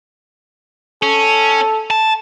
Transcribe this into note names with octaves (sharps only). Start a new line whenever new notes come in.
C#4 A4
A5